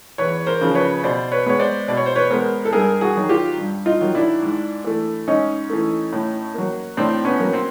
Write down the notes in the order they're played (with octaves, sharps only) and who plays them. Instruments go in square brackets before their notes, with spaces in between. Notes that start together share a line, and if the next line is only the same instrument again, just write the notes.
[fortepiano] E2 B4 C#5
A#4 C5
C#3 F3
B4 C#5
B2 C5 D5
B4 C#5
G#3 B3 C#5
C5 D5
B2 D5
C#5
C5
B4 C#5
G#3 B3 A#4 C5
A4
G2 G#4 A#4
F#4 G#4
D#3 F#3
F4 G4
G2
D#4 F4
D#3 F#3
D4 E4
G#2
E3 A3
G#2 C#4 D#4
E3 A3
A2
F#3 A#3
A2 C4 D4
B3 C#4
F#3 A#3
C4